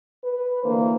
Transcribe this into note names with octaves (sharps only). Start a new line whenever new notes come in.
B4
D2 D3 E3 A#3 C5